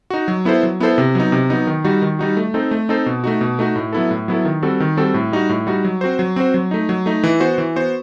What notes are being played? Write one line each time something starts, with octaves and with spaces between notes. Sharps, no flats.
D#4 F#4
F#3
B3 E4 A4 C5
F#3
B3 E4 A4 C5
C3
F#3 B3 D#4
C3
F#3 B3 D#4
D#3
G3 D#4 F#4
D#3
G3 D#4 F#4
A3
C4 D#4 A4 C5
A3
C4 D#4 A4 C5
B2
A3 D#4 F#4
B2
A3 D#4 F#4
A2
F#3 B3 E4 A4
A2
F#3 B3 E4 A4
D#3
G3 C4 F#4 A4
D#3
G3 C4 F#4 A4
A2
G3 D#4 F#4
A2
G3 D#4 F#4
F#3
C4 F#4 C5
F#3
C4 F#4 C5
F#3
A3 D#4
F#3
A3 D#4
E3
B3 F#4 C5
E3
B3 F#4 C5